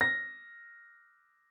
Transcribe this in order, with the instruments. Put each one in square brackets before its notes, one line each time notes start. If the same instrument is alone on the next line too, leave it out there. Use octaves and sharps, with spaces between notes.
[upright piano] A#6